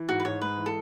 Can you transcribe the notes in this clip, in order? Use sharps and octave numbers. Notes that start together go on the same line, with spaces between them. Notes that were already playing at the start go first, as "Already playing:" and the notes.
Already playing: E3
G#2 F#4
B4
G#2 C#5
G#3 B4
E3
A4